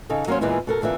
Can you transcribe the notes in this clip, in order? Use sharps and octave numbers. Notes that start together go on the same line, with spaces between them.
C#3 D#4 A4
F#3 A#3 C#4 C5 C#5
E2 A#2 E3 G#3 B3 E4
B2 A4 A#4
F2 D3 E3 A#3 E5